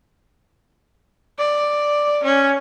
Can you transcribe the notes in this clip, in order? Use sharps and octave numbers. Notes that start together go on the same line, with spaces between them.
D5
C#4